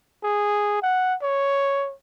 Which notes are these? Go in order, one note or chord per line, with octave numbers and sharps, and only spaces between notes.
G#4
F#5
C#5